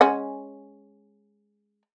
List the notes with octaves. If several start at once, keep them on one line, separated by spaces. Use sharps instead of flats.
G#3 C#4 F#5